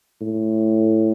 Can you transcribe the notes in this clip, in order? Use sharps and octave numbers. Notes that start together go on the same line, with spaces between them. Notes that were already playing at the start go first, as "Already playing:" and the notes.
A2